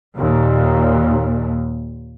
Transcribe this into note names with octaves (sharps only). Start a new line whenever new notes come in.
D#2 A#2